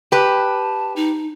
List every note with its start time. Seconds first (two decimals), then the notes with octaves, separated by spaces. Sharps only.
0.12 G4 B4 A5
0.96 D#4